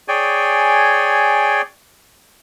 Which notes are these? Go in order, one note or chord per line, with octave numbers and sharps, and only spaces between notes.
G#4 C#5 D5 G5 G#5